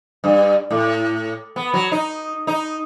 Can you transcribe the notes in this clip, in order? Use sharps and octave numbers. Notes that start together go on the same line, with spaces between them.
G2
A2
B3
F#3
D#4
D#4